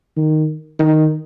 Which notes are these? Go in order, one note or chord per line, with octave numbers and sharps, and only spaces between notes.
D#3
D#3